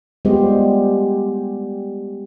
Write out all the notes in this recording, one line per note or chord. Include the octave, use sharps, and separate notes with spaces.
G3 G#3 B3 F4 G4 C5